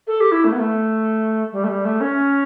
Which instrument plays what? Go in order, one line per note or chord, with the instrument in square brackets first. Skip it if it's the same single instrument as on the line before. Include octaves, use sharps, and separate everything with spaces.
[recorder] A4
G4
E4
A3
B3
A3
G3
A3
G3
A3
C#4